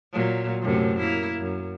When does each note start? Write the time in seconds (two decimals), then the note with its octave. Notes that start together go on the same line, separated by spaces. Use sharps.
0.13 A#2 F#3
0.62 F#2 A2 C3
0.99 A#3 E4
1.40 F#2